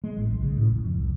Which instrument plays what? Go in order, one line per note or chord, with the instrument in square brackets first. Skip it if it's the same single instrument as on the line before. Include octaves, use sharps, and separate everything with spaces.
[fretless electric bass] G#3
A1
B1
C#3
A2
D1
F2
C2